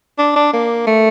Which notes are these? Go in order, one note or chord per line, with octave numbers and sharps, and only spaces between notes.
D4
D4
A#3
A3